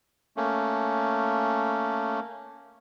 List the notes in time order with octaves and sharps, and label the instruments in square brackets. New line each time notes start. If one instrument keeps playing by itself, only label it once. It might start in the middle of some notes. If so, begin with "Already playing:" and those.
[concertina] A3 A#3 C#4